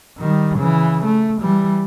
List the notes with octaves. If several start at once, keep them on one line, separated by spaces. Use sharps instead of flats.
D#3 G3
C#3 E3
A3
E3 G3